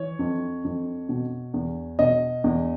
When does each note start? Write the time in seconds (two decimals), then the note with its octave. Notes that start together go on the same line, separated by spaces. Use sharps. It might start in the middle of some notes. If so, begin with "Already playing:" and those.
Already playing: E3 C#5
0.19 F2
0.64 F2
1.09 B2
1.54 E2
1.99 B2 D#5
2.44 E2